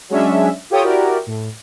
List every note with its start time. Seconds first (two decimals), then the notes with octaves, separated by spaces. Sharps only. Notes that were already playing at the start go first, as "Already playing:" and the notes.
0.09 F#3 G#3 C#4 D4 E5
0.70 F4 G4 A4 C#5 G5 D#6
0.83 E4 F#4 G4 A#4 D5
1.27 A2